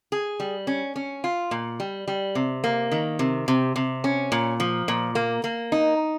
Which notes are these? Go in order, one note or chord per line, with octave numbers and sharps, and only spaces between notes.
G#4
G3
C#4
C#4
F4
A#2
G3
G3
C3
A#3
D#3
C3
C3
C3
C#4
A#2
F3
A#2
A#3
A#3
D#4